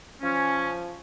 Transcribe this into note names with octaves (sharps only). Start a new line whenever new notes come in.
F3 C#4